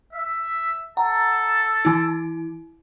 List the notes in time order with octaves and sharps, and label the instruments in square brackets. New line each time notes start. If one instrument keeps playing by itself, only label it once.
[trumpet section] E5
[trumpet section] A4 A5 [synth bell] F#5 A#5
[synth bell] E3 E4